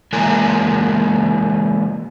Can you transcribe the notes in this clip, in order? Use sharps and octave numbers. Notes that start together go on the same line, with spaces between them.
E3 G#3 A#3 A#4 G#5